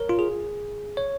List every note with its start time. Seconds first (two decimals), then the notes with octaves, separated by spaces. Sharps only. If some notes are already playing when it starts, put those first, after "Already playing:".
Already playing: A#4 C#5
0.09 F4
0.19 G#4
0.97 C#5